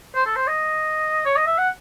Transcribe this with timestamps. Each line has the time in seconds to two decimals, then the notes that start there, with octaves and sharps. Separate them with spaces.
0.15 C5
0.26 A4
0.36 C5
0.48 D#5
1.26 C#5
1.37 D#5
1.47 E5
1.58 F#5